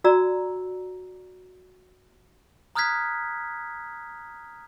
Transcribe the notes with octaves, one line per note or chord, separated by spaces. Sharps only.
F#4 D5 A#5 E6
A#5 D#6 F6 F#6 G#6 B6